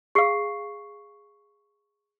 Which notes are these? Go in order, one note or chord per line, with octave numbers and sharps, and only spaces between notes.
G#4 F5 C#6 C7